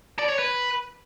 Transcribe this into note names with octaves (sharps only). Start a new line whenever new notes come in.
D5
C#5
B4